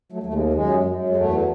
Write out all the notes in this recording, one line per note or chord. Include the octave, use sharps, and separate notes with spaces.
F#3 A3
D#2 A3
G#3
F#2 G#3
F#2
G#3
E2 F#3 A3